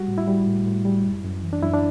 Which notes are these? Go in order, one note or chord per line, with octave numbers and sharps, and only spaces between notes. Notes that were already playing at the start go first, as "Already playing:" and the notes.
Already playing: G3 F#4
A2
E4
G3
A2
A2
G3
F#2
F#2
E3
D4
F#2 E4
D4